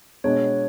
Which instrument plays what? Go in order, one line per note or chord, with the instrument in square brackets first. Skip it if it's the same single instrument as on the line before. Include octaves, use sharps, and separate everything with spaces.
[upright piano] B2 G#3 B3 D4 [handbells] C#5